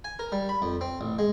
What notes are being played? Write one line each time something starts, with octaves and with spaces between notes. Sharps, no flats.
G#5
A#4
G3
B5
F2
C4
A1
G#3